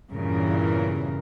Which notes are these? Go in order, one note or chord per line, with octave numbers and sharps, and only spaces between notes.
E2 G2 A#2 C#3 E3 A#4